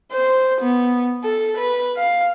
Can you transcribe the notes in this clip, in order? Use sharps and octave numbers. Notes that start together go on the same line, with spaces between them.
C5
B3
A4
B4
F5